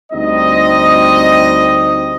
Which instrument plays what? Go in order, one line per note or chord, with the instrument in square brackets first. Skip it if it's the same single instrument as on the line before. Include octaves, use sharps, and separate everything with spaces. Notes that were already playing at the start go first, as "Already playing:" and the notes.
[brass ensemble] D2 G3 C4 D#4 D#5